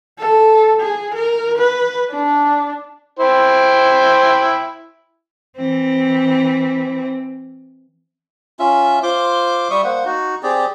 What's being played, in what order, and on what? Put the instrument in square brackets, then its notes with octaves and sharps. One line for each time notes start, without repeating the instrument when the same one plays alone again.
[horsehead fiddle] A4
G#4
A#4
B4
D4
[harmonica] E4 C5 G5
[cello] E3 C4
[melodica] C#4 F4 E5
F4 C5 C6 D6
G3 E5 C#6 D#6
A#3 C5 F#5
D#4 F#4
C4 G4 G#4 D5